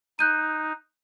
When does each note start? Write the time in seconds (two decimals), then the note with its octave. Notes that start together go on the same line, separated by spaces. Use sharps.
0.19 D#4 F#6 G6 D#7